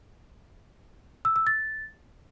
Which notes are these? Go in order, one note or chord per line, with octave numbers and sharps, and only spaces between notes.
E6
E6
A6